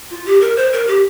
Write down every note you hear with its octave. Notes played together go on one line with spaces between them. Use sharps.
F4
G4
A#4
C5
A#4
G4